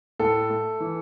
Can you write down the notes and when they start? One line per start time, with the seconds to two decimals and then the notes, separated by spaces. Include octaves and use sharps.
0.19 A2 A4
0.50 A3
0.80 E3